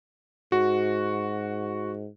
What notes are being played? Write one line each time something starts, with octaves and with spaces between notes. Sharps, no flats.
G#2 F#4